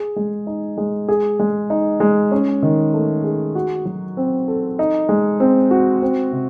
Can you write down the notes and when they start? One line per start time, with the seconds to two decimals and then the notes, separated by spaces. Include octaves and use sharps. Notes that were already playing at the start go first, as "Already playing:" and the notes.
Already playing: G#4
0.16 G#3
0.47 D#4
0.78 G#3
1.08 G#4
1.40 G#3
1.70 D#4
2.00 G#3
2.32 C#4
2.62 D#3
2.94 A3
3.24 G#4
3.55 F#4
3.86 F#3
4.17 C4
4.48 A4
4.79 D#4
5.09 G#3
5.40 C4
5.71 F#4
6.02 C4
6.32 C3